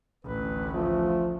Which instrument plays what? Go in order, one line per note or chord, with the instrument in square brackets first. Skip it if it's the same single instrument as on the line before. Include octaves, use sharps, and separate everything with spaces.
[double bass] A1 D2 [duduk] B4
[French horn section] F3 F4 [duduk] A3